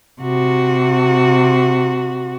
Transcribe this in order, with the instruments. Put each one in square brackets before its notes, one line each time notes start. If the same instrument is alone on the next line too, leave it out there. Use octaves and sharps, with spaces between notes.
[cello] C3 F#4